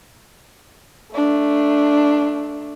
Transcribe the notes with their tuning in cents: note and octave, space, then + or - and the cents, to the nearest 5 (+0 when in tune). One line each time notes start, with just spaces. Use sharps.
A3 +0 D4 +0